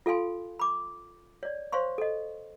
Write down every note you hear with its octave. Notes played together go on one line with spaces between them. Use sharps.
F4 A4 F5 G#5 C6
B5 D6
C#5 D5
C5 C#5 F5 C6 C#6
A4 D#5